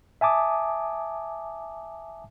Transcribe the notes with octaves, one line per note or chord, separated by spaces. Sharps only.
E5 G#5 A5 D6 D#6